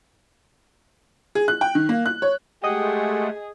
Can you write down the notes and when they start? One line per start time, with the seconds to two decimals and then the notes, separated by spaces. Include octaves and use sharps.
1.35 G#4
1.48 F#6
1.61 G5
1.75 D#3
1.89 A#3
2.06 F#6
2.22 C#5
2.64 G#3 A3 G4 G#4 D#5 F#5 G5 D#6